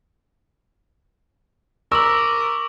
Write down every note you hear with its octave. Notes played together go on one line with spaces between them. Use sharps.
A#4 C#6 D6 E6 F#7